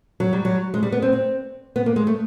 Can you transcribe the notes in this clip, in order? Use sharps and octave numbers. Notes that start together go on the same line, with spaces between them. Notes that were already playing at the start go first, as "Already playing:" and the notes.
F#3
G3
F#3
G#3
G3
B3
C4
C4
B3
A#3
G#3
A3